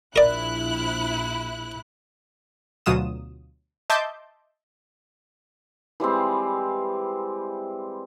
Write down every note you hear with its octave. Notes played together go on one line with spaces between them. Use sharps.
A#1 E4 A#4 D5 F#6
D2 B2 F#3 F4 D#6 E7
D#5 E5 A5 C6 D6 G6
E3 G3 G#3 C4